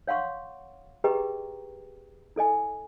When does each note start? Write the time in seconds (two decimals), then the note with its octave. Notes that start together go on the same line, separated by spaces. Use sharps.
0.07 C#5 F5 F#5 C6 C#6
1.04 G4 G#4 B4 D#5 G5 A#5
2.36 E4 A4 D#5 G#5